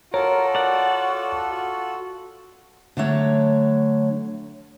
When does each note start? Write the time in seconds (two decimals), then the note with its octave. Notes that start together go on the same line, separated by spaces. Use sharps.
0.14 F4 F#4 A4 A#4 C#5
0.55 D5 F#5
1.54 F#4
2.97 D3 F#3 A3 C#5